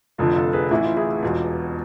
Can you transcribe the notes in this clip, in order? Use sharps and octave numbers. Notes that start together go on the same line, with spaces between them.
F1 F2 D3 F3 F4 A4
F4 A4
G#4 B4
A1 A2 E3 E4
F4
E4 G#4
E1 E2 B2 F4